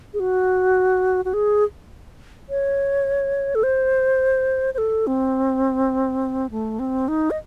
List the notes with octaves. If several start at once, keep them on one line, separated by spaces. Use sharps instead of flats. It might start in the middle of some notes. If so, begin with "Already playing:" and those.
G#4
F#4
F#4
G#4
C#5
A4
C5
C5
A4
C4
A3
C4
D#4
D#5